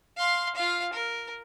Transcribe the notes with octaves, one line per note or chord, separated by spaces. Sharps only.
F5 C6
F4 F5
A#4